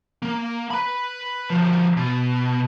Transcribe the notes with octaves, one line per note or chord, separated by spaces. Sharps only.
A#3
B4 B5
D3 F3
B2